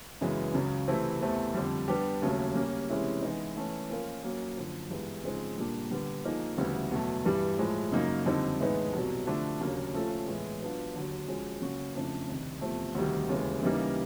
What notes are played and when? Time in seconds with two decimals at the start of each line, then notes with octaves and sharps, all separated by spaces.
0.21 F#2 C#3 E3 G#3 B3
0.54 C#2 C#3 F#3
0.88 C3 E3 A3 C4 E4
1.21 E2 C3 E3 A3 C4
1.54 F2 D3 G3
1.88 G3 B3 D4 G4
2.22 D#2 C#3 F#3 A3
2.55 G3 A#3 C#4
2.89 C3 E3 G#3 C#4 E4
3.22 E3 G#3 B3 D#4
3.57 E3 A3 C#4
3.89 F3 A#3 C#4 F4 A#4
4.23 F#3 A#3 C#4
4.57 F#2 D3 F3
4.90 G2 E3 G#3 B3
5.24 C#3 F3 G#3 C4 D#4
5.57 A#2 G3 A#3 D4
5.91 D3 G3 B3
6.25 F3 A#3 D#4 G#4
6.57 D2 C#3 E3 G3 B3
6.91 E2 B2 F#3 A3
7.25 G2 E3 G3
7.58 A2 F3 G#3
7.92 F#2 C#3 F#3 A#3 D#4
8.26 F2 D3 G3 C4 D#4
8.60 A2 E3 G#3 B3 D#4
8.93 C2 B2 F#3
9.26 D3 F3 A3 D4
9.60 D#2 C#3 F#3 A#3 D4
9.94 F3 A3 C#4 F4 A4
10.27 A2 E3 G#3 B3
10.60 F#3 B3 D4 F4
10.94 D#2 D3 F#3
11.28 F3 G#3 C#4 F#4
11.61 C#3 F#3 A#3 C#4 F#4
11.95 F2 C#3 F3 A3 D4
12.28 C2 C3 D#3
12.61 E2 C3 F3 A3
12.95 D2 C3 D#3 G3
13.29 D#2 C#3 E3 G#3
13.62 C#3 E3 G3 A#3 D#4